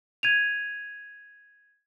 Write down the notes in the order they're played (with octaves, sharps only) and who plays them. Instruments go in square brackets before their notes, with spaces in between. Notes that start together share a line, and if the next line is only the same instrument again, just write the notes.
[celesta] G#6 D#7 F7